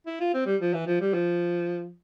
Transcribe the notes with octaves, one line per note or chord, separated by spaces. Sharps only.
E4
F4
C4
G3
F3
E3
F3
G3
F3